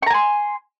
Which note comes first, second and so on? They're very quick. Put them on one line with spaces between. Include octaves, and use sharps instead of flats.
C#6 A#5 G#5 C6